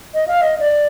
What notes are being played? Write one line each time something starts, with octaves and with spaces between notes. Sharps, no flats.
D#5
F5
D#5
D5